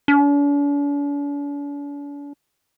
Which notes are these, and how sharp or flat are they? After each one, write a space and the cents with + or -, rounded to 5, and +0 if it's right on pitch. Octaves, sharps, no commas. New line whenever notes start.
D4 -45